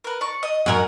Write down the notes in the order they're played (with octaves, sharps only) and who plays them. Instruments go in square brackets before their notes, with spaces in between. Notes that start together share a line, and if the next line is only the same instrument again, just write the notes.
[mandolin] A#4 B4
D5 C#6
D#5
[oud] F#2 A#4 [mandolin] F#5 G#5